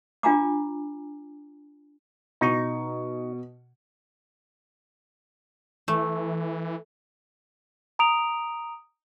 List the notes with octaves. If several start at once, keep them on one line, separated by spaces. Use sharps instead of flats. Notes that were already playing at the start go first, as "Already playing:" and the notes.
D4 F4 G#5 A#5 D6
B2 D#4 C#6
E3 A3
A#5 D#6 D7 F7